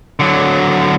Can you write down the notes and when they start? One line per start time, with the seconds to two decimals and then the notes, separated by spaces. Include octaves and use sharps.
0.20 D3 F#3